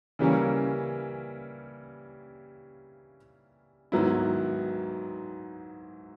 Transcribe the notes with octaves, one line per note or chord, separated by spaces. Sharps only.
C#3 E3 G3 A#3 C#4
G#2 D#3 F#3 B3 E4